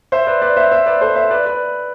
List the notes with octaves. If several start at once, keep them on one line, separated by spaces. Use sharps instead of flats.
C5 E5
B4 D5
B4 D5
C5 E5
C5 E5
B4 D5
A4 C5
C5 E5
B4 D5
B4 D5